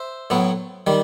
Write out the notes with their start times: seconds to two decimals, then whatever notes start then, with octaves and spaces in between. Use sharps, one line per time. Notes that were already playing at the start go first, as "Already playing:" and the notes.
Already playing: C5 E5
0.30 A2 F#3 B3
0.87 D#3 G3